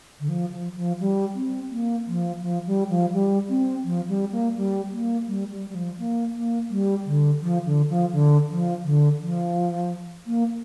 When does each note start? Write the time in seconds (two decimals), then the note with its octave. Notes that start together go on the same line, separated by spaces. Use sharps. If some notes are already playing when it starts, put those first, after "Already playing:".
0.20 D3
0.29 F3
0.52 F3
0.76 F3
1.00 G3
1.35 C4
1.70 A#3
2.07 F3
2.42 F3
2.67 G3
2.89 F3
3.13 G3
3.50 C4
3.84 F3
4.08 G3
4.32 A#3
4.56 G3
4.92 A#3
5.28 G3
5.51 G3
5.69 G3
5.75 F3
5.99 A#3
6.34 A#3
6.70 G3
7.06 D3
7.41 F3
7.65 D3
7.89 F3
8.12 D3
8.49 F3
8.84 D3
9.20 F3
10.27 A#3